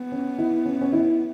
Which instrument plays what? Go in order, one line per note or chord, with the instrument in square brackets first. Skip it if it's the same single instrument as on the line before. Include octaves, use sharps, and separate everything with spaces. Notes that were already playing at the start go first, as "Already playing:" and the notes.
Already playing: [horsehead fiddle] B3
[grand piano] C#4
E4
C#4
C#4
E4